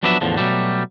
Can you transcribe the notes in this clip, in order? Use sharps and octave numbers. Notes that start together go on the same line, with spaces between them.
F3 F#3 B3 D4 B4 E5
E2 A2 D3 F3
B2 F#3 G3 A3